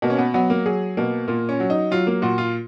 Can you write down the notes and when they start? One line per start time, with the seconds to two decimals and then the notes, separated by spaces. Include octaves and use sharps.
0.02 B2 A#3
0.10 C#4
0.18 B3
0.34 F#3 B3
0.50 A#3
0.66 F#3 G#4
0.97 B2 A#3
1.28 A#2 A#3
1.49 C#4
1.60 F#3
1.70 D#4
1.91 F#3 F4
2.07 A#3
2.22 A#2 F#4
2.38 F4